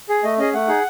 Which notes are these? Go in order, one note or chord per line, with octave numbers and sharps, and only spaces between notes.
G#4
A3 D#5
C#4 G#4 D#5
A3 F#5
D#4 G#4